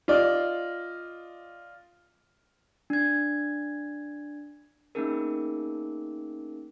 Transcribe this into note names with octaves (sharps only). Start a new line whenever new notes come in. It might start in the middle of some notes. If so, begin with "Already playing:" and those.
F4 D5 D#5
D4 G#6
A#3 B3 C#4 D#4 G#4 A#4